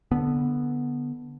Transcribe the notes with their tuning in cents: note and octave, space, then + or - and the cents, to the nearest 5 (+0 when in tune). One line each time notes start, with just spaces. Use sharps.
D3 -5 B3 -10